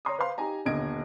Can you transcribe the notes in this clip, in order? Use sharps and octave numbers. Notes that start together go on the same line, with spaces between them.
C#5 A#5 C6 D#6
B4 C5 F5 C6
D#4 G4 G#5 A#5
D#1 B1 D3 D#5 G#6 D7